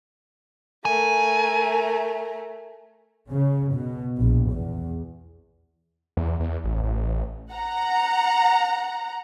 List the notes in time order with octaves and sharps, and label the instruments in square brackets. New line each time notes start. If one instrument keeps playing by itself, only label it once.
[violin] A3 A#4 [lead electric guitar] G#5
[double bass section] C#3
B2
A#1
E2
[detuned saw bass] E2
E2
A1
A1
[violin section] F#5 A#5